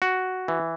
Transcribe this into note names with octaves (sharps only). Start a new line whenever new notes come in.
F#4
E3